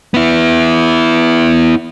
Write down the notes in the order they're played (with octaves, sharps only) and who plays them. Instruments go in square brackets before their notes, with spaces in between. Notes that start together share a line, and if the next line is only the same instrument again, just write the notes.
[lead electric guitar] B3 E4